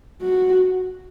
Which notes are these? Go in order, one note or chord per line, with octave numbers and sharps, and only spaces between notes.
F#4